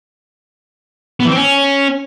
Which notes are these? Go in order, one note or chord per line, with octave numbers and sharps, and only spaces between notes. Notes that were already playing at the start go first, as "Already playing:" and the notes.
B3
E3
C4
C#4